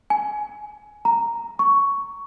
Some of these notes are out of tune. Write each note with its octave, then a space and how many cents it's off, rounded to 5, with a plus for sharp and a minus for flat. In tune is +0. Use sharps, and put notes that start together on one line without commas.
G#5 +20
A#5 -5
C#6 +10